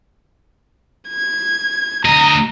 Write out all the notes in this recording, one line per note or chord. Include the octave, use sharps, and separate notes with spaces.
G#6
D2 D#5 A#5